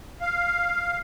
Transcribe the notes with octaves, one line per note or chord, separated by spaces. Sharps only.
F5